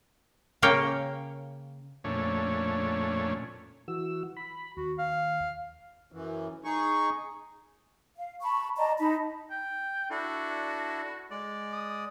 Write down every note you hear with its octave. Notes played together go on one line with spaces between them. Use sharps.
C#3 A#3 C#5 F5 G5
F2 A#2 A3 C#4 D4 C#5
E3 F#4 E6
B5
D#2 F#4
F5
F#2 E3
D#4 G#4 C#6
F5
A5 B5 C#6
D5 D#5 A5 A#5
D#4 A5 B5
G5
D4 E4 F#4 A4
G#3 D5
D#6